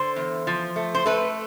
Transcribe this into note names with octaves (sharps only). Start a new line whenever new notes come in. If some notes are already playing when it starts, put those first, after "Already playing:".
Already playing: D3 C5
E2
F3
A3
C5
A3 B4